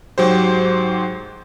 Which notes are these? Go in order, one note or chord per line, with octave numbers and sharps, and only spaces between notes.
G#2 F#3 G4 C5